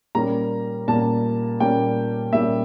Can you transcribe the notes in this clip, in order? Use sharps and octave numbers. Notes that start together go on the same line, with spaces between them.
A#2 G3 A#3 C#4 A#5
A#2 G3 A#3 C#4 A5
A#2 G3 A#3 C#4 G5
A#2 G3 A#3 C#4 E5